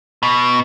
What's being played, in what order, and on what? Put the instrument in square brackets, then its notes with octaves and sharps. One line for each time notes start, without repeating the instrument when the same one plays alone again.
[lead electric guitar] B2